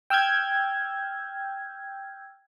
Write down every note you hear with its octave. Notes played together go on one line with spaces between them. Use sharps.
G5 E6 F6 G6 G#6